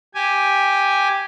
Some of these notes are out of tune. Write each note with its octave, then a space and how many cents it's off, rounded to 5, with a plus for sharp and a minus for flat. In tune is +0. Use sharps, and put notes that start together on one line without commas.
G4 +0 G#5 -5